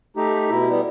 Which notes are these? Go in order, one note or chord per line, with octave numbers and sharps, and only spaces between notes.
A3 D#4 G4
B2 E4
G3 B3